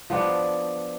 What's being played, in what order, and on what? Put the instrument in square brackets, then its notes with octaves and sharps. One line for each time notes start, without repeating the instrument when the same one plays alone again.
[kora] F3 B3 D4